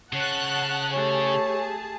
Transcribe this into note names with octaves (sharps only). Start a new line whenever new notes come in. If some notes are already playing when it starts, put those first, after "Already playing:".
C#3 C#5 F#5 A5 F#6
A3 G4 G#4 C#5 A5